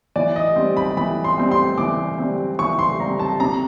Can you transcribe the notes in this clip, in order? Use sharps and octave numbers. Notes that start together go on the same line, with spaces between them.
E3 D5
D#5
G3 C4
B5
E3 B5
C6
G3 C4
C6
E3 D6
G3 C4
E3 C#6
C6
G3 C4 A#5
A5
C3 A#5